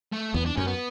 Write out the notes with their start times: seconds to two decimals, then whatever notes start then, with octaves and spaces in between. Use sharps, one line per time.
0.13 A3
0.34 E2 B3
0.46 D4
0.57 F#2 C#4
0.67 B3